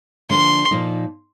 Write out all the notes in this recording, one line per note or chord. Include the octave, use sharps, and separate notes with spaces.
D3 F3 A#3 D4 C6
A#2 F3 A#3 D#4